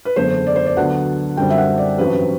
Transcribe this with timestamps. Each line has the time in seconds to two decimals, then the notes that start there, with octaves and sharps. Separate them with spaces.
0.05 B4
0.16 F#1 E2 D3 A3 C5
0.47 D5
0.56 C5
0.66 D5
0.77 D2 D3 F#3 B3 D4 F#5
1.37 F#2 D3 G3 C4 G5
1.50 E5
1.58 F#5
1.78 D5
1.98 A1 G2 F#3 C4 B4